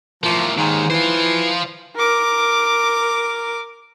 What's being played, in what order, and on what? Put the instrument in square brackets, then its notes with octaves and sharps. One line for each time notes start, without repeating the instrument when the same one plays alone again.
[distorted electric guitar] A2 A#3 [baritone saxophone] F3
[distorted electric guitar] D#2 D#3 [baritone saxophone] G#2
[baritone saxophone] E3 [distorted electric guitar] F4 C5
[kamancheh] A#4 D6